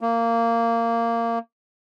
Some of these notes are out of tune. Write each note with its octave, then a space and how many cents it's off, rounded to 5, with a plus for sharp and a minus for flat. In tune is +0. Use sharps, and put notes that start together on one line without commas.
A#3 -15